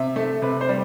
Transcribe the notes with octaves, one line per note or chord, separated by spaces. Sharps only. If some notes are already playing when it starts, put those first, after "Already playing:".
Already playing: C3 E5
A3
C3 B4
C5
G3